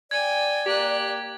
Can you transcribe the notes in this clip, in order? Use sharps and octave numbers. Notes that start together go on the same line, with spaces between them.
D5 G5 G#5 G#6
A#3 G4 F#6